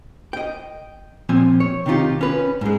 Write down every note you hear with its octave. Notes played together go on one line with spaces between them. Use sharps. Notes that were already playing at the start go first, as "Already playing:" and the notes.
D#5 G5
A#2 F3 C4 G#5
C#5
C3 D#3 D#4 F4 G4
C#4 B4
G#2 G#3